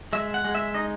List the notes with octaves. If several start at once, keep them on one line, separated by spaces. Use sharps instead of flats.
G#3 E5
F#5
G#3
E5
D#4 D#5